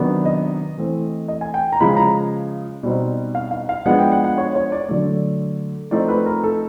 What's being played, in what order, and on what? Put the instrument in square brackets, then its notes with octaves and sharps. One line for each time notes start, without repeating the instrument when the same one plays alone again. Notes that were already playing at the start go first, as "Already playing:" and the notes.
Already playing: [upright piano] C3 D#3 F#3 B3 D4
D#5
E3 A3 C4
D#5
G#5
G5
A#5
C#3 F3 G#3 B5
A#5
B2 G3 C4 D#4
F5
F5
F5
F3 G#3 B3 D4 F#5
G5
F#5
F#5
C#5
C#5
D5
D3 F#3 A3 D5
F3 A3 C4 D#4 D5
B4
A#4
A4